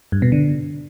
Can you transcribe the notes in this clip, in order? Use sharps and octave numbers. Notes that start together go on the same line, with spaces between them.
G2
B2
D3